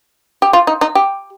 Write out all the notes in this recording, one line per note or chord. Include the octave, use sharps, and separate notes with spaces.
G4
F4
D#4
D#4
G4